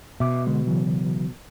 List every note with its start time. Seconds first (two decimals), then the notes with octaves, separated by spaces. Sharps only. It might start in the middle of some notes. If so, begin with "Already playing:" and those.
0.20 B2 E5 D6
0.47 D3 G#3
0.67 C#3 E3 F#3